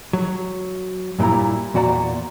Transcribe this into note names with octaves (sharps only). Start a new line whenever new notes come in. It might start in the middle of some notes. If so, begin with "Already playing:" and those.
F#3
G2 A#2 G3 E4 A#5
E2 A#2 F#4 D5 A#5